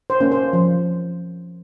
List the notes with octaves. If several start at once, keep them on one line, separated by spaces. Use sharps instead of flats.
C5
A#3 C#4
C5
F3